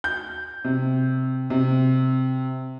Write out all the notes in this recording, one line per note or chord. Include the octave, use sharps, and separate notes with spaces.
G6
C3
C3